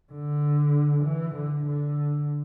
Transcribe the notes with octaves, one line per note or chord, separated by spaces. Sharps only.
D3
E3
D3
D3